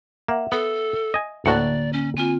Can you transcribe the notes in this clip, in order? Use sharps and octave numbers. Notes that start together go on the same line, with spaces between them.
A#3 E5 F#5
B3 A4
D#5 G#5
D2 A2 D3 A#3 F#4 D5
C#4
C4 F4 G#5